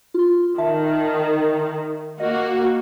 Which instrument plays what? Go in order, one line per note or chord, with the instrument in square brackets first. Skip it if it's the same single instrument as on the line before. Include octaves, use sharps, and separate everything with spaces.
[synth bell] F4 C6
[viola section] D#3 [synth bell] E5 A5
[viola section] A#3 F#4 [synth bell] D#5